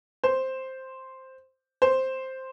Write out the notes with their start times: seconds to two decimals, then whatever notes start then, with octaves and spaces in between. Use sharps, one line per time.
0.24 C5
1.82 C5